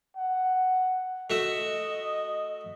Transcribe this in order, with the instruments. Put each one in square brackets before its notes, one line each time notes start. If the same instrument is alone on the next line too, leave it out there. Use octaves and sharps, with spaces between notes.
[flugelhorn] F#5
[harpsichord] A3 F#4 E5 [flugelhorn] D#5